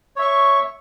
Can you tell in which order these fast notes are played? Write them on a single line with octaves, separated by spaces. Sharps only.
C#5 E5 C#6